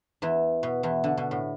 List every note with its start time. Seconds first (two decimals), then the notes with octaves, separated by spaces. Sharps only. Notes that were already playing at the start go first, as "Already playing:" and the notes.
0.22 E2 E3
0.63 B2
0.83 E2 E3
1.04 D3
1.17 B2
1.31 A2